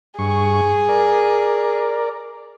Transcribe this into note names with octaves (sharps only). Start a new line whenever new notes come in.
G2 G#4 C#6
A#4 D5